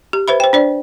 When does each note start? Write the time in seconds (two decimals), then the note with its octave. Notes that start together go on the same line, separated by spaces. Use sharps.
0.13 G4
0.28 B4 C5 E5 B5
0.40 C5 G5
0.53 D4 C5 D5